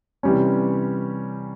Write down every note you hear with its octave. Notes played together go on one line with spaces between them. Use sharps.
C3 E3 G3 C#4